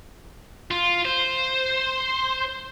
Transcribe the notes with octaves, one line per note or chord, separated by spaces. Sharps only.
F4
C5